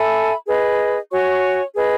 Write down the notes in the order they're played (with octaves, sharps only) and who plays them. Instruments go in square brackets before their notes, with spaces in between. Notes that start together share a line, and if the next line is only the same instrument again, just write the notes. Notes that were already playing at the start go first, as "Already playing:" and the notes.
Already playing: [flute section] A4 E5 G#5 B5
G#4 B4 D#5
F#4 C#5 G#5 C#6
G#4 B4 D#5